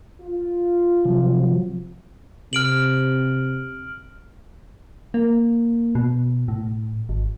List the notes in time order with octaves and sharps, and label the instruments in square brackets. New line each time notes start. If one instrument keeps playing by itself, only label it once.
[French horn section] F4
[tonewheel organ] C3 F3 F#3
[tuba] C3 [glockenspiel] F6 D7 F#7
[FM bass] A#3
B2
A2
G#1